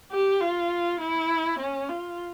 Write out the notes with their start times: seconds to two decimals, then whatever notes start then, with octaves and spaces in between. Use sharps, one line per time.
0.11 G4
0.41 F4
1.00 E4
1.59 C#4
1.89 F4